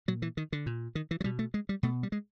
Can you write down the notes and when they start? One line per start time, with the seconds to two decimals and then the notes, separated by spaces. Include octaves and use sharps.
0.08 A#2 F#3
0.22 E3
0.37 D#3
0.52 D3
0.66 A#2
0.95 D#3
1.11 E3
1.21 F#3
1.24 B2 G3
1.39 A3
1.54 G#3
1.69 G3
1.83 B2 A3
2.03 G3
2.12 G#3